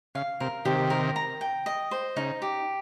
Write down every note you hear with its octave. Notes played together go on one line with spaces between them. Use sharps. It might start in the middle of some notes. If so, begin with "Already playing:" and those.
C#3 F5
C3 A#4
C3 D#3 G4
A#4
A#5
G5
D#5
C5
C#3 D#4
G4